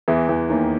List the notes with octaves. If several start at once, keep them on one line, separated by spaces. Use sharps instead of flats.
E2 E3
E2 E3
D#2 D#3